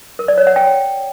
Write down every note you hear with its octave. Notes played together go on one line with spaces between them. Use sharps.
A#4
D5
C#5
F#5
G5